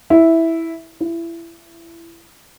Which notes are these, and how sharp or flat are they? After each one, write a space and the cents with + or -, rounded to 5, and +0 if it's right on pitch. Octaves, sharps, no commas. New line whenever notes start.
E4 -5
E4 +25